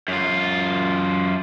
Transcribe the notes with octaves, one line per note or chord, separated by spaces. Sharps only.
F#2 F4